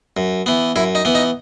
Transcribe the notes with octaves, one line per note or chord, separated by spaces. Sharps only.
F#2
E3 B3
F#2 E4
D#4
E3 B3
D#4